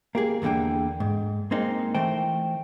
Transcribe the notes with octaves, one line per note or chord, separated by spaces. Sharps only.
A#3 G4 G#4
E2 A2 D3 A#3 G5
G#2
G#3 A#3 C4 D#4
E3 A3 C5 G5